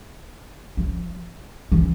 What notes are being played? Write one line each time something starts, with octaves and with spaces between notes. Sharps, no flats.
F3
E3